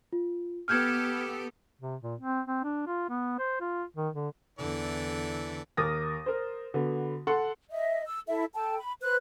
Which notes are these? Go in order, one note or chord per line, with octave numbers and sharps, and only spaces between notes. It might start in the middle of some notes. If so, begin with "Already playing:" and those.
F4
B3 G4 A4 F6 G6 G#6
C3
A#2
C4
C4
D4
F4
B3
C5
F4
D#3
D3
E2 D3 E3 A4 D5
D#2 A#4 D6 D#6 A6 A#6
A#4 C5
D3 B3 F#4
A4 F#5 C6
D#5 E5
E6
E4 A4 E5
A4 G5 A5
B5
B4 C5 F#6